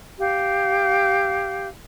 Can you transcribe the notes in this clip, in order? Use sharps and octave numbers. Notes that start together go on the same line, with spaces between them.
G4 F5